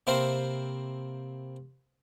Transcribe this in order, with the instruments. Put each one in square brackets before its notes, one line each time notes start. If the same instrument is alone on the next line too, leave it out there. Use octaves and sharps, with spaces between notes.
[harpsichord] C3 A#3 C4 E4 A#4 C5